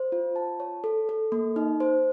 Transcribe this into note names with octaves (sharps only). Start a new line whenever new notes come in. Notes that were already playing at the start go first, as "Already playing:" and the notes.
Already playing: C5
F4
A5
C#5
A4
A4
A#3
D#4
C5